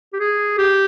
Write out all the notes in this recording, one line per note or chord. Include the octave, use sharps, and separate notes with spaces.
G4
G#4
G4